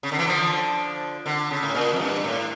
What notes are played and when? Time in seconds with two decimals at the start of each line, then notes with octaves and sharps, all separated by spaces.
0.03 C#3
0.12 D3
0.19 E3
0.27 D3 F3
1.26 D3
1.51 C#3
1.63 A2
1.75 A#2
1.93 F2
2.00 G2
2.24 A2